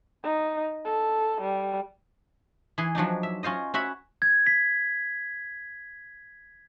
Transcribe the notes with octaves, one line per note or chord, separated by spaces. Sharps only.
D#4
A4
G3
E3 G#4 C6
F3 F#3 D4 D#4
E5
C#4 F4 C5 D#5
C#4 F#4 E5 B5
G#6
B6